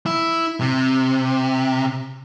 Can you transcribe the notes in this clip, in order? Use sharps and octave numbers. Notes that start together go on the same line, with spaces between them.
E4
C3